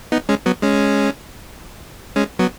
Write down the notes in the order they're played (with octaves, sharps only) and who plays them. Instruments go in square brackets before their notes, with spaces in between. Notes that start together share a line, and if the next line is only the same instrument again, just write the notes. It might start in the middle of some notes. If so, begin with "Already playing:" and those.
[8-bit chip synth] B3 D#4
G#3 C#4
F#3 B3
G#3 C#4
G#3 C#4
F#3 B3